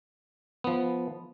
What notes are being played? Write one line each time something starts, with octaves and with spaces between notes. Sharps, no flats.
F3 B3